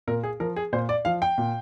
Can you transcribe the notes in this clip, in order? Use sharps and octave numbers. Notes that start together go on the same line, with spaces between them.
A#2 A#4
G#4
F3 A#4
G#4
A#2 C5
D5
F3 F5
G5
A#2